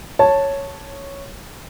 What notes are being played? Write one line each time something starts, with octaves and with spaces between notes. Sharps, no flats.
C#5 A5